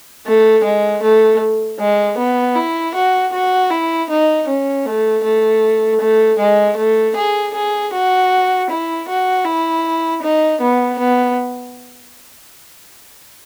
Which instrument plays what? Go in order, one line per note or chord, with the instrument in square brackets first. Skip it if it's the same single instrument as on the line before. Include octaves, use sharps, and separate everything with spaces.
[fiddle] A3
G#3
A3
G#3
B3
E4
F#4
F#4
E4
D#4
C#4
A3
A3
A3
G#3
A3
G#4
G#4
F#4
E4
F#4
E4
D#4
B3
B3